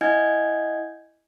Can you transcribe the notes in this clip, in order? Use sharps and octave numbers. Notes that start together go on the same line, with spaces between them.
E4 D#5 F#5 G#5 G6 G#6